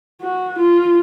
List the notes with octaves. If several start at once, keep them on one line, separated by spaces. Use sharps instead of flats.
F#4
F4